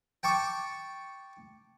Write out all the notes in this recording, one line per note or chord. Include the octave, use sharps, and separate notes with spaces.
G5 A5 C#6 D6